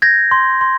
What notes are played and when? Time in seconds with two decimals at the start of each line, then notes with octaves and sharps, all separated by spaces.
0.02 G6 G#6 A#6
0.31 C6
0.61 C6